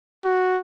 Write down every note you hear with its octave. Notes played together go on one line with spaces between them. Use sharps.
F#4